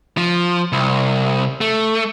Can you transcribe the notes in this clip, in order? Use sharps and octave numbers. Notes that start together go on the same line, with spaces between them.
F3
C2
A3